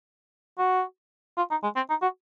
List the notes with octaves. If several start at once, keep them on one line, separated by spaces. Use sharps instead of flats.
F#4
F4
D#4
G#3
C4
D#4
F#4